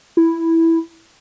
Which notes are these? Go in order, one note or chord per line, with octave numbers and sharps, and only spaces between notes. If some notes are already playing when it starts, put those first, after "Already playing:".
E4